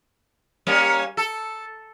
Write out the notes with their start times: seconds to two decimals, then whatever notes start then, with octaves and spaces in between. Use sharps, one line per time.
0.67 G3 A#3 C#4
1.17 A4